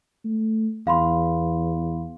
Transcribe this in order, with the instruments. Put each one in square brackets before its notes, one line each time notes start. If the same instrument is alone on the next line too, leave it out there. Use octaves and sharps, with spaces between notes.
[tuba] A3
[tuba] E2 [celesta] F5 B5 C6